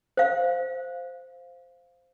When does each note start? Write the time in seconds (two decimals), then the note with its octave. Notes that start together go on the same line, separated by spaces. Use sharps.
0.17 C5 F5